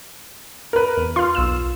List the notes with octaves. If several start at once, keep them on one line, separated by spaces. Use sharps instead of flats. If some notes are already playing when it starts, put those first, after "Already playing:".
A#4 B4
E2
F4 C6 F6
B1 E6 E7